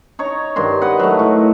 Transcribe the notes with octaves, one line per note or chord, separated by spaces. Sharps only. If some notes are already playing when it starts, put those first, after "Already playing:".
D#4 C#5 A#5
G2 D#3 C6
B4 D#5 F#5
F#3 A3
A2